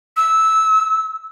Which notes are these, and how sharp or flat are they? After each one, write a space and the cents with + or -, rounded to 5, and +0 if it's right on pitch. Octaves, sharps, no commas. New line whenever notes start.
E6 -15